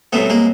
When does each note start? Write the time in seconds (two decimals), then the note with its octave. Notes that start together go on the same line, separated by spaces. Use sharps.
0.13 C2 B2 F#3 A3 B3
0.30 G#3 A#3